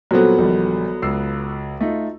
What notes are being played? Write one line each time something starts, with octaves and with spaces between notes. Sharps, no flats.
A#2 F#3 G3 B3 C4 F#4 A4
A#1 D#3 G3
C#2 E6 C7
A3 D#4 F4